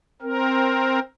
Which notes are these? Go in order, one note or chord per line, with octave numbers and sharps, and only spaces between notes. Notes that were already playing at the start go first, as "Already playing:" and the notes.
C4 A#4